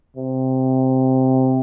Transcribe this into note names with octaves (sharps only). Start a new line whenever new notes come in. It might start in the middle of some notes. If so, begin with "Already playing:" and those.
C3